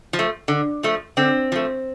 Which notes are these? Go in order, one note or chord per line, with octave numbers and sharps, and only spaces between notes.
F3
A3
D3
F3 A3
D3 C4
F3 A3